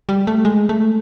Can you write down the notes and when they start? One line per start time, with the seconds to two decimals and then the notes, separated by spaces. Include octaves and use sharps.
0.09 G3
0.27 A3
0.45 G#3
0.69 A3